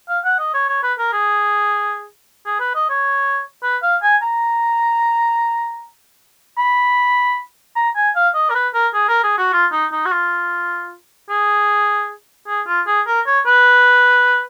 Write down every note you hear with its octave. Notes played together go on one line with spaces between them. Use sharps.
F5
F#5
D#5
C#5
C#5
B4
A#4
G#4
G#4
B4
D#5
C#5
B4
F5
G#5
A#5
B5
A#5
G#5
F5
D#5
A#4
B4
A#4
G#4
A#4
G#4
F#4
F4
D#4
D#4
F#4
F4
G#4
G#4
F4
G#4
A#4
C#5
B4